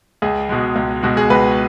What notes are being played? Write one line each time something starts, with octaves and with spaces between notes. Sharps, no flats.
C#2 G#4
B2 G#3
C#2
B2 G#3 F#4
G#4
C#2 B4